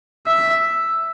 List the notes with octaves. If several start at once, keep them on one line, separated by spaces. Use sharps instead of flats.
E5